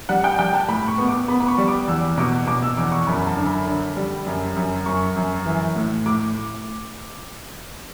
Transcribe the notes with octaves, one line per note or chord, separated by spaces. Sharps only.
G3 F#5
G5
G3 G5
A5
A2 B5
C#6
B3
D6
B3 B5
B5
C#6
G3
D6
E2 E6
B2 D6
B2 D6
E6
E2 D6
C#6
F#2 B5
A5
D3
B5
D3
G3
F#2
F#2
F#2 C#6
F#2
E3
A2
A2 D6